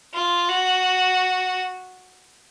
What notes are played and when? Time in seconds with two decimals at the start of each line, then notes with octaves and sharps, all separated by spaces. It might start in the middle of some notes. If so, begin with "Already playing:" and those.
0.14 F4
0.49 F#4